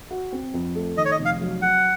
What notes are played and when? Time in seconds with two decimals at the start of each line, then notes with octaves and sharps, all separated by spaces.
0.11 F#4
0.32 C4
0.54 F2
0.75 A3
0.97 D#3 D#5
1.05 C#5
1.11 D#5
1.19 F1
1.25 F5
1.41 F#3
1.62 F#3 F#5